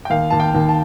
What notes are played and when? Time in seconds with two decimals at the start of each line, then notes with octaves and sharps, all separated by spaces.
0.05 G5
0.10 D#2 F5
0.30 D#2 A5
0.40 G5
0.55 D#2
0.69 A5